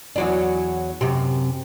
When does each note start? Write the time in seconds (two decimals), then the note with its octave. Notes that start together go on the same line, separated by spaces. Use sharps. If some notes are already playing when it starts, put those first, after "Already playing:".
0.16 E2 F#3 D4
1.01 F#2 C3